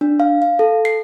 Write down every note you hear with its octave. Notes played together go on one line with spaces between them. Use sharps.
D4
F5
F5
A4
C7